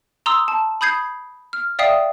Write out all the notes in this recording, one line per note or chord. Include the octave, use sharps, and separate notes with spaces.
A#5 C6 D#6 E6
A5
B5 D#6 G6 G#6 C7
F6
D5 E5 F5 G5 D#6 C7